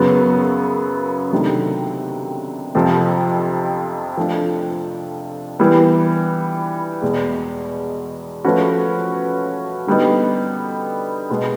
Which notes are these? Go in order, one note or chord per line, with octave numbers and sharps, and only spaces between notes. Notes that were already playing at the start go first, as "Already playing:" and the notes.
Already playing: F#2 C#3 F#3 B3
C3 D#3 F#3 A3 D4
F2 C3 F3
F3 A3 D4 F4
E3 G3 B3
E2 B2 G#3
F3 A3 C#4 F#4 B4
D3 G3 B3 D#4
B2 G#3 B3